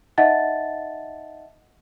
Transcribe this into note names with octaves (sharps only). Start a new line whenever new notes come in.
D#4 D#5 E5 F#5 A5 A6